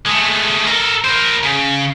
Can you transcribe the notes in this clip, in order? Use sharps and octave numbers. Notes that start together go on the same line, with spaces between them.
G#3 A3
A4 A#4
A#4 C5
C#3